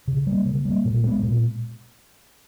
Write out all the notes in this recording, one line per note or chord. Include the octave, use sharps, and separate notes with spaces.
C#3
G3 A#3
C#3
G3 A#3
A#2
G#3 B3
A#2